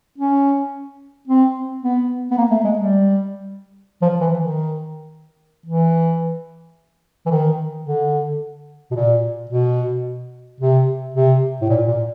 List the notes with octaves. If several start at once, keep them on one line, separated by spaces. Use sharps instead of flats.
C#4
C4
B3
B3
A#3
A3
G#3
G3
F3
E3
D#3
E3
E3
D#3
D3
B2
A#2
B2
C3
C3
A2
A#2
A#2